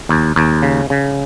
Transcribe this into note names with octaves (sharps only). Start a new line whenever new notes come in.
D#2
D#2
C#3
C#3